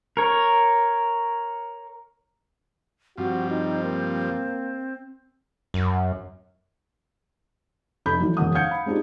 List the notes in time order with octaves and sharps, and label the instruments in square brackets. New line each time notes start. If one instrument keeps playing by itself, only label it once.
[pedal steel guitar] A#4 C#5
[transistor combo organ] G2 F3 [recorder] C4 [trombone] F#4
[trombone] D#4
A#3
[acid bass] F#2
[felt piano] F1 A4 B5 G6
E3 F#3
E1 F#2 F#5 D#6
F5 F#5 G6 G#6 C#7
B5
G#3 C4 D4 D#4 F4 G4